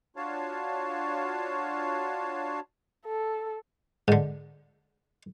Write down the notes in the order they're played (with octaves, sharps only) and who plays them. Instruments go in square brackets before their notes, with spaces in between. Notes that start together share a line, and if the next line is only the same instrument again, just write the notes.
[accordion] D4 F4 F#4 C#5 F5 A5
[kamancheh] A4
[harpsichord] G#2 D3